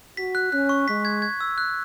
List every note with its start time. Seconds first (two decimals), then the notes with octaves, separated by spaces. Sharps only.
0.17 F#4 B6
0.35 F#6
0.52 C#4 F#6
0.69 C#6
0.88 G#3 B6
1.05 G#6
1.22 G#6
1.40 E6
1.58 F#6